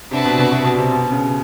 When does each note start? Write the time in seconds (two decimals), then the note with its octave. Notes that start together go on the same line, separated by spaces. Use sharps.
0.11 C3 D4 F#4 B4 E5 A5
0.25 B2
0.38 B2
0.52 B2
0.65 B2
0.78 C3
0.91 B2
1.11 C#3